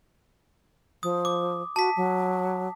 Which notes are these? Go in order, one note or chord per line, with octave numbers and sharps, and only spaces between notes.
F3 D#6
D6
F#4 A5 B6
F#3